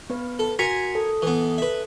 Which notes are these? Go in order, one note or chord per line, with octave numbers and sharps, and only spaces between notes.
B3 B4
A4
F#4 A#4 G#5 B6 C#7
A4
E3 B3
B4 E5